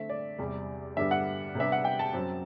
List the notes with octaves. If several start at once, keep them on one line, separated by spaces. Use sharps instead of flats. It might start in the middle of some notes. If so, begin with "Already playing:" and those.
Already playing: D3 A3 C4 E5
D5
E2 C3 G3
G2 D3 G3 B3 D4 E5
F#5
C3 G3 B3 D4 E5
F#5
G5
A5
F#2 F#3 C4